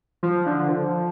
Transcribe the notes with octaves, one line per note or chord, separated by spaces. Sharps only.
F3
D3
F3